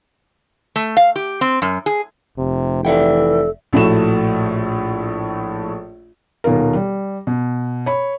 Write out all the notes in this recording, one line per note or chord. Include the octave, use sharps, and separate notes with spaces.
A3
F5
G4
C4
F#2
G#4
F1 C3
E3 A4 D5 E5 G5
A#1 A2 A3 F#4 E7
D#1 B2 D#3 F4 A#4
G3
B2
C#5 B5